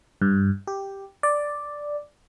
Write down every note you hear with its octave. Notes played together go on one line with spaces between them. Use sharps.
G2
G4
D5